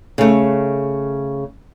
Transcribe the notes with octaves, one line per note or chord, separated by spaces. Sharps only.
C#3 A3